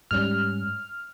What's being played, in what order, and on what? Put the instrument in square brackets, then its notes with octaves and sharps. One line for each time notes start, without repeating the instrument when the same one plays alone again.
[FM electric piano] G#2 G3 C#4 F6